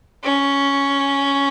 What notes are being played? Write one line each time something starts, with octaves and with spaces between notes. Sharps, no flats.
C#4